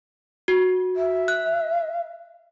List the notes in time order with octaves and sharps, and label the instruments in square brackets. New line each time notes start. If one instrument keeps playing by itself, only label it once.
[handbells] F#4
[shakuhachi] E5
[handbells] F#6